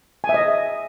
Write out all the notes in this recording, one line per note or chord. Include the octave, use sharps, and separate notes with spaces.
G#5
E5
D#5